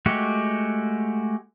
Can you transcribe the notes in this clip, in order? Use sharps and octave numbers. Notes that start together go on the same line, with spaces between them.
G#3 A3 F#4 G4